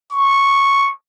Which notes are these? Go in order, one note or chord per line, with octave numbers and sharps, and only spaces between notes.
C#6